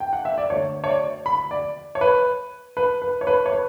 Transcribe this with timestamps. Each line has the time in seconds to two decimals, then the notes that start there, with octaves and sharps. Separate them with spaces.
0.00 G5
0.13 F#5
0.25 E5
0.38 D5
0.50 D2 D3 C#5
0.84 C#5
0.88 D5
1.26 B5
1.51 D5
1.95 C#5
2.01 B4
2.77 B4
3.02 B4
3.21 C#5
3.27 B4
3.46 C#5
3.52 B4